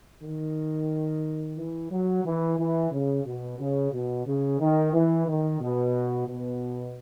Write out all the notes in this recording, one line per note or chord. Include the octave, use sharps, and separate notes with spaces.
D#3
E3
F#3
E3
E3
C#3
B2
C#3
B2
C#3
D#3
E3
D#3
B2
B2